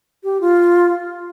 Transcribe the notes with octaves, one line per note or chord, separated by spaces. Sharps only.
G4
F4